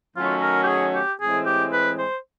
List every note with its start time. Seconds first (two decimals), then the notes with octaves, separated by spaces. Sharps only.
0.16 D#3 F#3 A3 C#4 F4 F#4
0.42 A#4
0.64 G4
0.67 G#4
0.95 G4
1.20 A2 E3 G#3 C4 G#4
1.46 G4
1.73 B4
1.99 C5